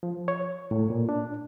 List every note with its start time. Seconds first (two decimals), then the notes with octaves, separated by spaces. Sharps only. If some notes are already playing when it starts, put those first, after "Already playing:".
0.03 F3
0.28 C#5
0.71 A2
0.90 A#2
1.09 D4